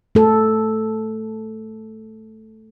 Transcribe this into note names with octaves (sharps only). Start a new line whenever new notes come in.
A3 A4